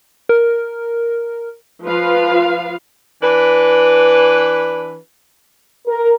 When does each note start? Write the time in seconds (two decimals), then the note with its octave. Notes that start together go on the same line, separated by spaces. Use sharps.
0.29 A#4
1.84 F3 F4 B4 F5
3.22 E3 D4 B4
5.87 A#4